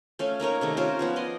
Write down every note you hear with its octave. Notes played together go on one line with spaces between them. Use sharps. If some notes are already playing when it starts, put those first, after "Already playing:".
A3 C#4 F5
A#3 D#4 A#4 C#5
C3 D#3 A3
C#4 F4 A#4 C5
F3 B3 C#5
D5 D#5 C6